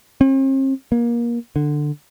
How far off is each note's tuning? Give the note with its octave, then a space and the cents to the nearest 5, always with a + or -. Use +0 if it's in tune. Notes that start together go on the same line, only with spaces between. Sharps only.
C4 +45
A#3 +25
D3 +15